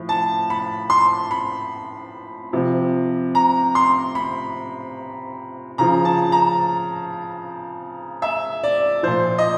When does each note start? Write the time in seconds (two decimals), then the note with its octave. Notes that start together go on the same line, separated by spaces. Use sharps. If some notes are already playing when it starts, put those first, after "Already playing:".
Already playing: A2 F3
0.09 A5
0.50 B5
0.90 C6
1.31 B5
2.53 C3 F3
3.35 A#5
3.75 C6
4.15 B5
5.78 C#3 F3 A#5
6.05 A5
6.32 A#5
8.22 E5
8.63 D5
9.03 A#2 F3 C5
9.38 D#5